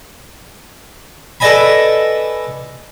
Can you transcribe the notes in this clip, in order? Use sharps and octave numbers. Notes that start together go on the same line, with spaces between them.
A4 B4 D5 D#5 G#5 B5